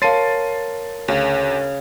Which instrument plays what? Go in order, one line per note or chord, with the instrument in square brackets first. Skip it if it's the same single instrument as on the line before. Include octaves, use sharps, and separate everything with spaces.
[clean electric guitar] A#4 C#5 [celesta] F5 A5 C6 [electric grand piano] A6 C7 D#7
[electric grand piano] D2 [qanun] C#3